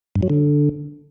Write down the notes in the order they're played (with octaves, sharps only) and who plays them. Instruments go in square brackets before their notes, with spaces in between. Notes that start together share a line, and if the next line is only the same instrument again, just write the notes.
[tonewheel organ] G2
F#3
D3